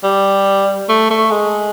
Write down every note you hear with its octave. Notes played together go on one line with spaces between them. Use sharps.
G3
A3
A3
G#3